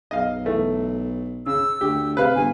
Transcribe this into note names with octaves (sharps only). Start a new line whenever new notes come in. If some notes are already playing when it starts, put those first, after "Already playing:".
B1 D#5 F5
E3 A3
C#3 E6
D2 G4
C3 B4 F5
G1 G#5